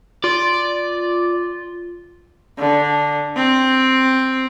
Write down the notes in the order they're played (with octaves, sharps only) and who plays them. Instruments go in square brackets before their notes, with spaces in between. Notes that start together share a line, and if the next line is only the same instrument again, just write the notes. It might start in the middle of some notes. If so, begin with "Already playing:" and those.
[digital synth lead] F4 [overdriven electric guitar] D5
[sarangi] D3
C4